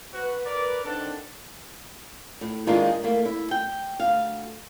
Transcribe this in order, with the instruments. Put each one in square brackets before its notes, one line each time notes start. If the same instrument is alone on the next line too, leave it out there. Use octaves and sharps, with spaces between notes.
[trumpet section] F#4 [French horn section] B4
[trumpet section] A#4 D5
[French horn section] D#3 C4 D4 [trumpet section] A4 F#5 A5
[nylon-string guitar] A2
G#2 D#3 G#3 A#3 D4 F4
A3 A#3 E4
E4
G5
D2 F5